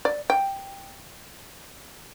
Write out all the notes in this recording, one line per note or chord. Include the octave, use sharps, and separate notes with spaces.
D5
G5